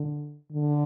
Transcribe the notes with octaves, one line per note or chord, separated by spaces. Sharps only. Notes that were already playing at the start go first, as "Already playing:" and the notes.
Already playing: D3
D3